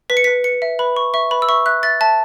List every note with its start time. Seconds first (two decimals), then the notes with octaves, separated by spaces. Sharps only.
0.10 B4 B6
0.17 C#7
0.24 B4 B6
0.44 B4 C#7
0.62 E5
0.79 B4 B5
0.97 B4 C#6
1.14 E5 C#6
1.31 B4 B5
1.42 E6
1.49 E5 C#6
1.66 E5 F#6
1.83 E5 A6
2.01 E5 A5